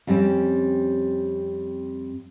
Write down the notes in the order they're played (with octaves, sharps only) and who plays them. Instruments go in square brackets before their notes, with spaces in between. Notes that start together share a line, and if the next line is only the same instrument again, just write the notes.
[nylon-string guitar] F2 G3 C4 C#4